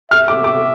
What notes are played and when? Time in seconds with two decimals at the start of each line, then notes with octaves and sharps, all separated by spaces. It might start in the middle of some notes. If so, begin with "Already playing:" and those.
0.11 E5 F6
0.28 D6
0.44 D6